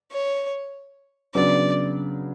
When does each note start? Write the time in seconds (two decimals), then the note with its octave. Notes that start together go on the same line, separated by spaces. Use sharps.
0.12 C#5
1.34 C#3 F#3 B3 D4 D5